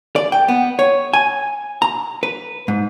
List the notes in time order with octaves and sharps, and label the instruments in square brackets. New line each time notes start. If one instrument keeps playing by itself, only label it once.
[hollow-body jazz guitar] D5
G5
B3
C#5
G#5
A#5
B4
G#2